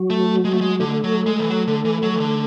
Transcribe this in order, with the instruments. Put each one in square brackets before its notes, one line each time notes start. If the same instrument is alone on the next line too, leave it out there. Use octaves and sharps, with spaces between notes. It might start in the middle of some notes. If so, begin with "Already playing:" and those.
Already playing: [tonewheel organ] F#3 F#4
[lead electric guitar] A3
G#3
A3
G#3
[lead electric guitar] D3 [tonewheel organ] A3 A4
[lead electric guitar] F#3
G#3
E3
F#3
D3
E3
F#3
E3
D3